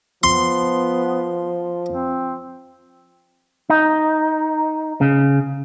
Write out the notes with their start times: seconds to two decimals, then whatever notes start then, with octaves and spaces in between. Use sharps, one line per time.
0.23 F3 B3 C6
1.89 C4
3.70 D#4
5.01 C#3